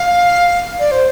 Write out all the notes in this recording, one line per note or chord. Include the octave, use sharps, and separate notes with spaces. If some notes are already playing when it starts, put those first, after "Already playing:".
Already playing: F5
D5
C5